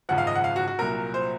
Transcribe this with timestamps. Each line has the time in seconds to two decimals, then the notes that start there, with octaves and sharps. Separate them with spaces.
0.09 G#1 F#2 C#3 F3 F#5
0.18 F5
0.27 D#5
0.36 F#5
0.44 F5
0.56 F#4
0.68 F#4
0.79 C2 A#2 F#3 A#4
1.14 C5